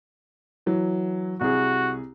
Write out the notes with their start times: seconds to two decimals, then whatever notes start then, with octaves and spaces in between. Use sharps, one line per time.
0.66 E3 F#3
1.41 C2 F#4 G#4